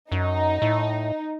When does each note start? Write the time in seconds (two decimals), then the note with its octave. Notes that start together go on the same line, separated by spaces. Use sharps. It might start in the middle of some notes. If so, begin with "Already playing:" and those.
0.12 F#2 D#4
0.62 A2